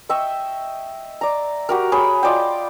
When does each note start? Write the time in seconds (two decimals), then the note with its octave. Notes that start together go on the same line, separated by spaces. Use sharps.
0.09 D#5 E5 G5 C#6
1.21 D5 A#5
1.69 F#4 G4 A#4
1.92 G#4 C#5 B5
2.23 F4 D5 D#5 G5